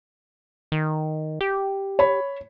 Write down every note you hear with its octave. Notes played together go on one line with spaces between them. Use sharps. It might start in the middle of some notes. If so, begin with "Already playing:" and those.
D#3
G4
C#5 B5